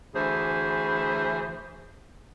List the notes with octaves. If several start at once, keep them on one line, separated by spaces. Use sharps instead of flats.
D2 E3 G#4 C5